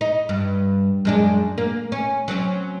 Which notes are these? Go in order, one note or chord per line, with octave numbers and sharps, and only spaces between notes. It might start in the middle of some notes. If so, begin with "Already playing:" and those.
D#4
G2
F#2 G#3 D4
A#3
C#4
F#3 C4 C#4